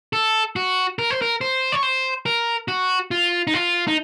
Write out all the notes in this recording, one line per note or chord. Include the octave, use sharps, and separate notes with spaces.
A4
F#4
A#4
C5
A#4
C5
C#5
C5
A#4
F#4
F4
D#4
F4
D#4